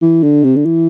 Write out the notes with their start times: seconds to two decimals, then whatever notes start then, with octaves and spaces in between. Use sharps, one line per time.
0.02 E3
0.23 D3
0.44 C3
0.56 D3
0.65 E3